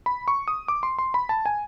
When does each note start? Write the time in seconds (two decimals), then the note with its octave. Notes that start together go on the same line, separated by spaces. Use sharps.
0.06 B5
0.28 C#6
0.48 D#6
0.68 D6
0.83 C6
0.99 C6
1.14 B5
1.29 A5
1.46 G#5